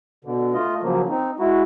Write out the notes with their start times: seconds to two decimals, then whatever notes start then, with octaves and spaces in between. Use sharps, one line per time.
0.25 B2 D3
0.54 A3 F4 D#5
0.83 C#3 F3 F#3 A#3
1.09 C4 D#4
1.40 G#3 E4 F#4